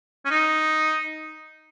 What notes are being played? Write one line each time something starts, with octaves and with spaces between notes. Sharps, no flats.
C#4
D#4